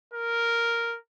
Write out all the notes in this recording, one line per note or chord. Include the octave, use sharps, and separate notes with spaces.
A#4